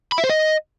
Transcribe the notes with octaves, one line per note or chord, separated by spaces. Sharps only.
B5
E5
C5
D#5